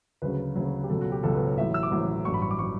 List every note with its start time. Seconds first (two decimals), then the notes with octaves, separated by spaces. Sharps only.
0.22 D2 C#3 F#3 B4
0.55 D2 C#3 F#3
0.84 G4
0.89 C#2 B2 F#3 A4
1.01 F#4
1.12 G4
1.23 C#2 B2 F#3 A4
1.35 B4
1.47 C#5
1.57 A1 A2 F#3 E5
1.74 E6
1.83 D6
1.91 A1 A2 F#3
2.25 A1 G2 F#3 C#6
2.34 B5
2.42 C#6
2.51 D6
2.59 F#3 C#6